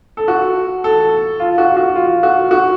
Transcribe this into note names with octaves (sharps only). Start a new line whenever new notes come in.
A4
F#4
A4
F4
F#4
F#4
F4
F#4
F#4